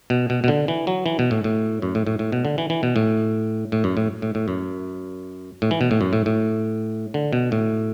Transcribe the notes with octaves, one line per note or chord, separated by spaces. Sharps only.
B2
B2
B2
D3
E3
F#3
E3
B2
A2
A2
F#2
A2
A2
A2
B2
D3
E3
E3
B2
A2
A2
F#2
A2
A2
A2
F#2
A2
E3
B2
A2
F#2
A2
A2
D3
B2
A2